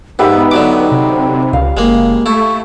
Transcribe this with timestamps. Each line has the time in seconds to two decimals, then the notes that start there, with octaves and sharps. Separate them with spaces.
0.19 G#2 B3 D#4 G4 B4 E5
0.51 D3 F#3 D6
0.92 C3
1.53 C#2 F5
1.77 F#1 G#3 A#3
2.26 A3 E4 C#6